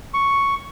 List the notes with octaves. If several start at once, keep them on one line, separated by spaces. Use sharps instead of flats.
C#6